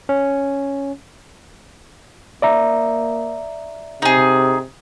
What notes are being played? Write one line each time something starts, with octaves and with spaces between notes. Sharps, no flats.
C#4
A#3 D5 E5 A#5
C3 D#4 G#4